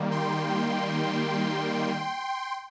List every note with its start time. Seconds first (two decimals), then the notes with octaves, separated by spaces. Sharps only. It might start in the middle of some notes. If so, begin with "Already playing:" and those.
Already playing: D#3 G3 A#3
0.11 G5 C6